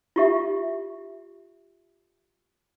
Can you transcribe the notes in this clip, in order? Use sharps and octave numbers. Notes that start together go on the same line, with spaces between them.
F4 G4 E5